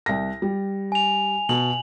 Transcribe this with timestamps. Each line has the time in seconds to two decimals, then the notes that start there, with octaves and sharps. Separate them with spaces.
0.06 C2 A#6
0.42 G3
0.92 G#5 F7
1.49 B2 F#7